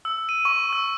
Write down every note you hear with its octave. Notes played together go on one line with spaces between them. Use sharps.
E6
D#7
C#6
E6